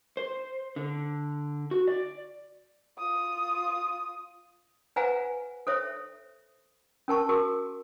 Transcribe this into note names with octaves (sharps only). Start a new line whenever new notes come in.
C5
D3
F#4
D5
F4 D#6
B4 C5 F5 F#5 G#5 A#5
A4 C5 C#5 E5
C#4 A#4 A5 C#6
F#4 G#4 A#4 C#6